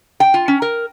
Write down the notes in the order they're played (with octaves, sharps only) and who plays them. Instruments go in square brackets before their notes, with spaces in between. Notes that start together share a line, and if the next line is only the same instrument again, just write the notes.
[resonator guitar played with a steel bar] G5
F4
C#4
A#4